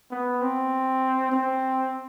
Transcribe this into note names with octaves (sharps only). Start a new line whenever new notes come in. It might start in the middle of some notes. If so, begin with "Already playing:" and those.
B3
C4
C4